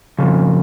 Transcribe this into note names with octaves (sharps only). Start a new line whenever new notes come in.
F2 C#3